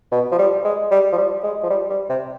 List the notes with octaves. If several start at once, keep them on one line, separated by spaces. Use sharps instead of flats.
B2
F3
G3
G#3
G3
F3
G3
G#3
F3
G3
G3
C3